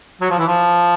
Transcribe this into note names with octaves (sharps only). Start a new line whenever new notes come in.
F#3
F3
E3
F3